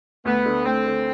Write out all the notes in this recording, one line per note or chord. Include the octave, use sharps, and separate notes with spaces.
D2 B3
D3 A3
D2 C4
D3 A3